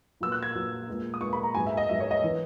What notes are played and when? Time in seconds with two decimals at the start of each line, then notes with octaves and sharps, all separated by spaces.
0.21 A#2 F#3 B3 E6
0.32 F#6
0.43 G#6
0.54 A#2 F#3 B3
0.87 A#2 G#3 B3
1.14 D#6
1.21 A#2 G#3 B3 C#6
1.33 B5
1.43 A#5
1.55 G#2 F#3 B3 G#5
1.67 E5
1.77 D#5
1.89 G#2 F#3 B3 E5
2.00 C#5
2.11 D#5
2.24 E3 B3